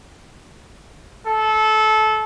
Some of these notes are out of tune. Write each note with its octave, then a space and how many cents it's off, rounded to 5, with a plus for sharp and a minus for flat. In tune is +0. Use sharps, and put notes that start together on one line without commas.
A4 -20